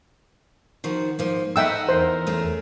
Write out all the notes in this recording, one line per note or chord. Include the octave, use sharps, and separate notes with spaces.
D#3 F3 F#4
G#2 F3 A#3
D#4 A4 E5 F#5 G5 E6
E2 A#4 C5
A3 C#4 G#4